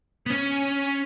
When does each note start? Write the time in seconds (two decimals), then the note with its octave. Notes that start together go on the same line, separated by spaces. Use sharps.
0.26 B3
0.30 C#4